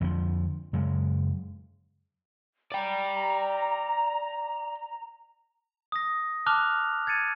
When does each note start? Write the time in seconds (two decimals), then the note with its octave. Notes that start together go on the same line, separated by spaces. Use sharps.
0.01 F2 D3 E3 F3
0.73 F#2 C#3 G#3
2.72 D5 G5 A#5
5.92 D#6 A#6
6.46 A5 D6 F6 F#6 F7 G7
7.07 G#6 A6 C#7 D#7